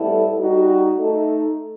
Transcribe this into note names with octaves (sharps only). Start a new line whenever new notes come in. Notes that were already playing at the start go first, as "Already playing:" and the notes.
Already playing: A2 G3 B3 E4 A4
G3 D#4 F#4
A3 D#4 A4